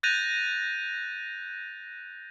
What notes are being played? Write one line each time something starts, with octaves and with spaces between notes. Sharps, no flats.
F#6 G6 A6 A#6 D#7 F7